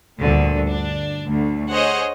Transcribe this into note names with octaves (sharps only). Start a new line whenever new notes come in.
D2 G2 A#2 D3
D4
D2
G#4 C5 C#5 D#5 F#5